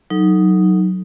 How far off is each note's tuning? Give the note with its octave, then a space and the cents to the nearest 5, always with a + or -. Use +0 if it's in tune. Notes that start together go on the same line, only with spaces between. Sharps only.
F#3 +0 D#4 +0 A4 +0